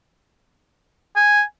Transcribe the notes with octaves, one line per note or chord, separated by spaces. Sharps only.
G#5